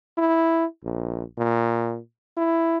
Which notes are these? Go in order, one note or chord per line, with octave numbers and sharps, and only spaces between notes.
E4
A#1
A#2
E4